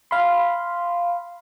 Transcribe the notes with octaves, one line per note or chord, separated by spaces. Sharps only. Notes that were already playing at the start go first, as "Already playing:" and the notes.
F5 B5 C6